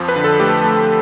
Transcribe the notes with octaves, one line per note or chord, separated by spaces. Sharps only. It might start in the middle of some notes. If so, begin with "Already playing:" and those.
Already playing: F2 F3
B4
D3
A4
A3 G4
A3